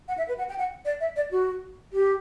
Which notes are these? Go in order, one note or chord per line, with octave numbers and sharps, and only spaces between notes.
F#5
E5
B4
F#5
G5
F#5
D5
E5
D5
F#4
G4